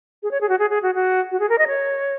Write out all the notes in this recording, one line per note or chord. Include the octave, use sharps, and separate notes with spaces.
G#4
C#5
G#4
F#4
G#4
G#4
F#4
F#4
F#4
G#4
A#4
D#5
C#5